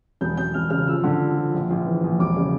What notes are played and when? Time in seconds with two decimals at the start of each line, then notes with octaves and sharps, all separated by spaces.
0.21 E1 G6
0.37 E1 G6
0.54 E1 F6
0.70 C#3 F6
0.87 F3 E6
1.04 D3
1.21 F3
1.36 F3
1.54 A#1
1.70 A#1
1.86 E3
2.03 A#1
2.19 E1 D6
2.37 C#3